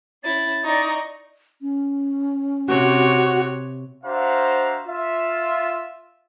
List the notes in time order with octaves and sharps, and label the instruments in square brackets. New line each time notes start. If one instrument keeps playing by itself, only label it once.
[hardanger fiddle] C#4 E4 [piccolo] A6
[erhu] D#4 [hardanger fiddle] D5 C#6
[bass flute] C#4
[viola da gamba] C3 C#5 [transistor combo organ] F#4
[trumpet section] D4 F#4 C5 E5 F5 A#5
F4 E5